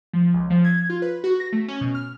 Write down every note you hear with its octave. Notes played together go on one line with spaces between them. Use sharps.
F3
C#2
F3
G#6
F4
B4
F#4
A#6
A3
C#4
B2
F6